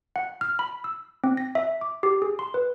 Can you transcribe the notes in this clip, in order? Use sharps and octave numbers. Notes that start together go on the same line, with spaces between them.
F#5
F6
B5
E6
C4
A#6
E5
D6
G4
G#4
C6
B4